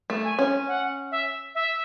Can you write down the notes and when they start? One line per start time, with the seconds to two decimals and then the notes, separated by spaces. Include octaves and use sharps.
0.10 A3
0.24 G#5
0.39 C#4
0.68 F#5
1.11 E5
1.55 E5